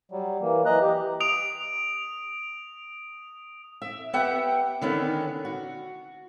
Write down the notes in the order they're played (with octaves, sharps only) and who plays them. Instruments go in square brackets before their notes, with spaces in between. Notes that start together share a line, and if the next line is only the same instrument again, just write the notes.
[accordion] F#3 G3
E3 A#3
E3 D#5 A#5 F#6
G4
[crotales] D#6 D7 F7
[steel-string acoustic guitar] E5
B3 G4 E5 F#5 G5
D3 D#3 B3 C#4
F#4